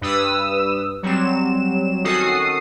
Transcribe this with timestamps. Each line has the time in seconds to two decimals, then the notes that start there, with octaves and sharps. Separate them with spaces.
0.01 G2 B4 D#6 E6
1.03 F#3 G3 C4 E7
2.04 D#3 C#4 F#4 A4 D#6 C7